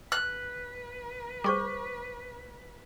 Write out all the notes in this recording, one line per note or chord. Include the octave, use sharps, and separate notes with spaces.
B4 F#6
G3 G#4 C5 C#6 D6 G6